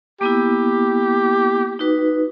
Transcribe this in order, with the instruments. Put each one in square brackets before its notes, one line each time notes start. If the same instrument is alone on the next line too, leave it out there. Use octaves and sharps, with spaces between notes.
[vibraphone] A#3 B3 E4 [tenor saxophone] G4
[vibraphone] D#4 F#4 B4